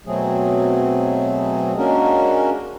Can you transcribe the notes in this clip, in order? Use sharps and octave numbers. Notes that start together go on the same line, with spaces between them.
B2 F#3 A3 C4 G#4
G#3 A#3 C#4 D4 F#4 A#4